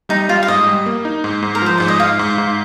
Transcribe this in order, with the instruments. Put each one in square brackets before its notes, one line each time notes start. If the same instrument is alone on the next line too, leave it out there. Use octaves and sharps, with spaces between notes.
[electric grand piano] G3 [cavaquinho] D#4
[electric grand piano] G3 [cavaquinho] F4
[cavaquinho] F5
[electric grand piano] G#2 [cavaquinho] D#5
[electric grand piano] G3
A#3
D#4
G#2
G#2
[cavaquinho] A#4
[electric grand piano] F3 [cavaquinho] C5
[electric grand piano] G#2 [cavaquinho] D5
[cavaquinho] D#5
[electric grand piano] G#2 [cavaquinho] F5
[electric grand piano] G#2
G#2